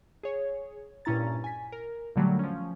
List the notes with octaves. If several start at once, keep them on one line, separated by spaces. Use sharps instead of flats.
G#4 C#5
G2 A#2 C#4 E4 A#5 A6
G#5 B6
A#4
A#2 D3 F#3 G3 A3
F3 C#4